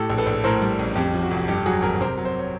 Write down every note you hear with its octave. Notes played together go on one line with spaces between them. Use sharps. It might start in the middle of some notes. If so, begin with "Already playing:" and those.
Already playing: A2 G4 A4
A#1
A4 B4
A#1
A2 A#4 C5
G3
A1
F2 G4
F3
F#4
F1
G2 G4
F#3 F#4 G#4
G#1 G#4 A#4
C3 A#4 C5
F#3
C5
C#5